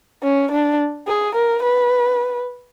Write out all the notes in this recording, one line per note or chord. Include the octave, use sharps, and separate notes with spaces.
C#4
D4
G#4
A#4
B4